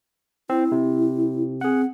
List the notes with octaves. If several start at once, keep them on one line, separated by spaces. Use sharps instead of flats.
C4 E4
C3
C4 G#4 F#5